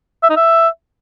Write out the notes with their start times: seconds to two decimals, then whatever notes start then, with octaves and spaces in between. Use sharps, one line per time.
0.23 E5
0.30 D#4
0.37 E5